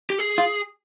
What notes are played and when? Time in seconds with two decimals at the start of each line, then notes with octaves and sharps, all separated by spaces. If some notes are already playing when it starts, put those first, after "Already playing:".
0.10 G4
0.19 G#4
0.38 F4